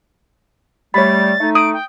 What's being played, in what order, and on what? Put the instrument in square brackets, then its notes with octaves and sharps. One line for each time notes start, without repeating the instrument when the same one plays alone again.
[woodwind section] G3 A3 [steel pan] C#5 B5 [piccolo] A6
[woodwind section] A3 D#4
[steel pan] D#6 [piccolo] D7
[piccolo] G5